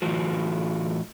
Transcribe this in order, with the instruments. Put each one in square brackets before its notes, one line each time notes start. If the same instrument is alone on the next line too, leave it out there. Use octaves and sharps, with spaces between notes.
[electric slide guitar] A2 E3 F4 F#4